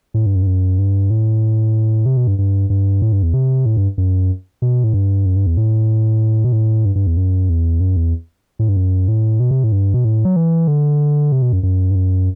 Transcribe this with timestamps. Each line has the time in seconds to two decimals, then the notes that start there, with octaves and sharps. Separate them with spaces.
0.14 A2
0.26 G2
0.35 F#2
0.42 G2
0.47 F#2
0.78 G2
1.10 A2
2.06 C3
2.17 B2
2.27 G2
2.38 G2
2.70 G2
3.02 A2
3.12 G2
3.23 E2
3.34 C3
3.66 A2
3.77 G2
3.98 F#2
4.62 B2
4.84 A2
4.93 G2
5.26 F#2
5.36 G2
5.47 E2
5.57 A2
6.44 B2
6.53 A2
6.85 G2
6.95 G2
7.07 E2
7.17 F#2
7.49 E2
7.80 F#2
7.97 E2
8.59 A2
8.69 G2
8.77 F#2
9.08 A2
9.40 B2
9.51 C3
9.64 A2
9.72 G2
9.94 B2
10.04 A2
10.25 F#3
10.36 E3
10.68 D3
11.32 C3
11.42 B2
11.53 F#2
11.63 F#2
11.91 G2
11.95 F#2